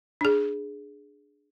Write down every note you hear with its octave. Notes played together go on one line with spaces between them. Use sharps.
D4 G#4